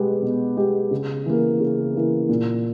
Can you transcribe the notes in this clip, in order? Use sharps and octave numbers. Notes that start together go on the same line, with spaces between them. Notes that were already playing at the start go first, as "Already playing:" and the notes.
Already playing: B2 G#3 B3 G4
B2
G#3 B3 G4
C#3
E3 A#3
C#3
E3 A#3
A#2